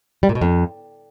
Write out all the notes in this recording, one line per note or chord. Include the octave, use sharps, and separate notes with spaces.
G3
A#2
B2
F2